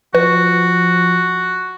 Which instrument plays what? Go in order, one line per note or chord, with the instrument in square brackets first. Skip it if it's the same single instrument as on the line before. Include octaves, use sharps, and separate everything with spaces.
[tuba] F3 [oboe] F#4 [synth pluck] B4